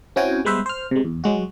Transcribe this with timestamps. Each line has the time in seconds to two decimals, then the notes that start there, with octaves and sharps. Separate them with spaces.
0.16 C4 C#4 E4 F#4 G5 G#5
0.45 G3 G#3 B3 B4 C5 E5
0.66 C5 F6
0.91 C3 G#3
1.04 E2
1.24 F#3 G#3 F#4